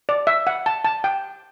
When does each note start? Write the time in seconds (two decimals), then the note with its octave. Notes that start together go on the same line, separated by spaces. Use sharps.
0.09 D5
0.27 E5
0.47 F#5
0.66 A5
0.85 A5
1.04 G5